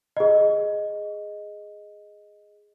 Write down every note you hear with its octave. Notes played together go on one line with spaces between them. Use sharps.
G#4 D#5